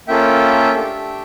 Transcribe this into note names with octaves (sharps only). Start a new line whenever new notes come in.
A#3 C#4 F4 A4 E5 G5
A3 D4 G4